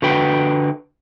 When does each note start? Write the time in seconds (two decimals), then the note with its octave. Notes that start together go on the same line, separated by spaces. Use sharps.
0.02 D3 F#4 B4 G5